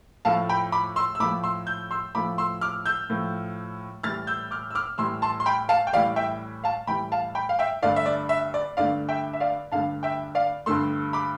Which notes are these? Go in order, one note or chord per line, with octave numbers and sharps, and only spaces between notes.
A2 F3 A3 F5 A5
G5 B5
B5 D6
C6 E6
E6
A2 F3 A3 B5 D6
C6 E6
E6 G6
C6 E6
A2 F3 A3 B5 D6
C6 E6
D6 F6
E6 G6
A2 F3 A3
A2 E3 G3 F6 A6
E6 G6
D6 F6
E6
D6 F6
A2 E3 G3 C6 E6
A5 C6
C6
G5 B5
F5 A5
G5
A2 E3 G3 D5 F5
E5 G5
F5 A5
A2 E3 G3 G5 B5
F5 A5
G5 B5
F5
E5 G5
G2 D3 A3 D5 F5
E5
D5
E5
D5
G2 D3 A3 D5 F5
E5 G5
E5
D5 F5
G2 D3 A3 F5 A5
E5 G5
D5 F5
G2 D3 A3 C6 E6
B5 D6